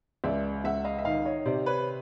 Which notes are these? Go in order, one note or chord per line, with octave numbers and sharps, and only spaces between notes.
C#2 D5 E5
C#2 E5 F#5
D#5 F5
E5
D#3 D#5 F5
C#5 D#5
C3 C5 D5
B4 C#5